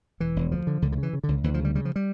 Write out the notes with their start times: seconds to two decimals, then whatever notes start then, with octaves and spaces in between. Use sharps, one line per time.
0.20 E1 E3
0.36 E1
0.52 D2 F3
0.67 D3
0.82 C#2 D3
0.92 D3
0.98 C#3
1.03 E3
1.13 C#3
1.24 C#2 D3
1.44 D2 E3
1.54 F3
1.60 C#3 G3
1.75 C#3 G3
1.85 F3
1.96 G3